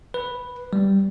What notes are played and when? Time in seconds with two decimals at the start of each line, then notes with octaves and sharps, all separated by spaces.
0.14 B4
0.73 G3